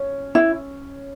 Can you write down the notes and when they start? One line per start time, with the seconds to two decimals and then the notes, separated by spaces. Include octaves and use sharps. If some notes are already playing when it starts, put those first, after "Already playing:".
Already playing: C#4
0.35 E4